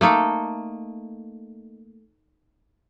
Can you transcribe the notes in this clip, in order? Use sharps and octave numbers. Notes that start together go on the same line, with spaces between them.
A3 A#3 D#4 A4